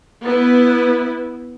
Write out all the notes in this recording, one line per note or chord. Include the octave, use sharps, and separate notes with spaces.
B3 E4 B4